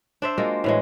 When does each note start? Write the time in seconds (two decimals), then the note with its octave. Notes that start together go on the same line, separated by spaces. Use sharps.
0.22 D4 C5 E5
0.38 G#3 A#3 F4 F#4
0.64 A2 E3 G#3